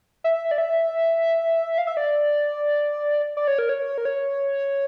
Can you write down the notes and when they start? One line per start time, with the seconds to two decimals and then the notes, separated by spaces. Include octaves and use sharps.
0.24 E5
0.51 D5
0.58 E5
1.78 F5
1.87 E5
1.97 D5
3.37 D5
3.48 C#5
3.59 A#4
3.69 C#5
3.98 A#4
4.05 C#5